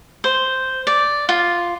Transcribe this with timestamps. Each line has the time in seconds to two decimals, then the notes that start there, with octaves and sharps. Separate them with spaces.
0.24 C5
0.87 D5
1.29 F4